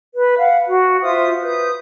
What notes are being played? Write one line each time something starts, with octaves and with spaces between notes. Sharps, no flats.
B4
F5 F#5
F#4
F4 C5 E5 D#6
B4 D#6 G6